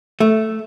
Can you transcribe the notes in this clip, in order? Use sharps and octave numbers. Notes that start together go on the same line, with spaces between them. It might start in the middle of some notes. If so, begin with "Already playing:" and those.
A3